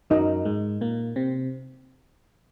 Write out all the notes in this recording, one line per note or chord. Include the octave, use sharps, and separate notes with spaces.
F#2 F#3 D#4 A#4 D#5
G#2 G#3
A#2 A#3
C3 C4